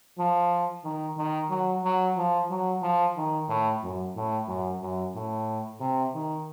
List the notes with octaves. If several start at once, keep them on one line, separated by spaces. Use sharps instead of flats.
F3
D#3
D#3
F#3
F#3
F3
F#3
F3
D#3
A2
F#2
A2
F#2
F#2
A2
C3
D#3